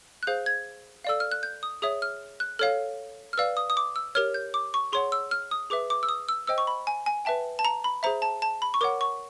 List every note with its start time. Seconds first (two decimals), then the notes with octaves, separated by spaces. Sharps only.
0.23 F#6
0.27 G#4 C5 F5 G6
0.46 G#6
1.04 A4 D5 F5 E6
1.20 F6
1.31 F#6
1.43 G6
1.63 D#6
1.82 G#4 C#5 E5 D#6
2.02 F6
2.40 F#6
2.59 A4 C#5 F5 F6
3.33 F6
3.38 B4 D5 F5 E6
3.57 D#6
3.70 D#6
3.77 D6
3.96 E6
4.15 G4 A#4 C#5 F6
4.34 G6
4.54 D6
4.74 C#6
4.93 G#4 C#5 F#5 C6
5.12 E6
5.31 F6
5.51 D#6
5.70 G#4 B4 E5 D6
5.90 D6
6.03 E6
6.09 D#6
6.29 E6
6.47 C5 D#5 G5 E6
6.58 C#6
6.67 B5
6.87 G#5
7.06 G#5
7.25 B4 E5 G5 A5
7.59 A5
7.65 A#5
7.84 B5
8.03 G#4 C5 E5 A#5
8.22 A5
8.42 A5
8.62 B5
8.74 C#6
8.81 A#4 C#5 F#5 D6
9.01 C#6